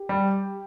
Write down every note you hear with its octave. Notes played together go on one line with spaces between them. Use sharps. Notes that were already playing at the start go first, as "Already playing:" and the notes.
Already playing: G4
G3